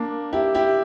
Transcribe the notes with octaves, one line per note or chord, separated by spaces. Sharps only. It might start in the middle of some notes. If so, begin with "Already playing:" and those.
Already playing: A#3 D4
E4 G4
E4 G4